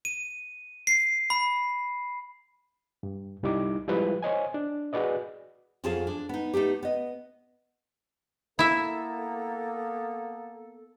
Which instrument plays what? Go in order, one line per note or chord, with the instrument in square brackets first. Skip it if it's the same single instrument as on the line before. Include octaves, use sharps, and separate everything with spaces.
[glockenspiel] D#7
C7
B5
[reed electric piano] G2
C2 G3 D#4 E4 D6
F3 G3 G#3 E4 G4 B4
C5 C#5 D#5 G#5
D4
F#4 G#4 B4 D5 D#5
[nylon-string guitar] F2 F#3 F4 G#4 F5 A5
D4
B3 D#4
A3 B3 D#4 G4
B3 D#5
[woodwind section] A#3 B3 A4 [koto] E4 E5